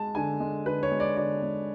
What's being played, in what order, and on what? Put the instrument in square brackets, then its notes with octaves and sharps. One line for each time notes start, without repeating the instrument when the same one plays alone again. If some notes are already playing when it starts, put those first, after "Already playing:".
Already playing: [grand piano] G#3 A5
D3 G#5
G#3
D3 B4
C#5
G#3
D5
D3 D5
G#3